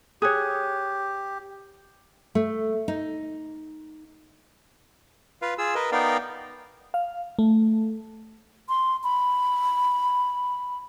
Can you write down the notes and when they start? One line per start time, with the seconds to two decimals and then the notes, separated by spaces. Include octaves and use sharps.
0.22 G4 G#4 C#5 D#6 F#6 G#6
2.35 A3
2.88 D#4
5.42 F4 B4 F5
5.58 F4 G#4 E6
5.75 A#4 B4 D#5
5.92 B3 D#4 A#4 D5 F5 G5
6.94 F5
7.39 A3
8.69 C6
9.04 B5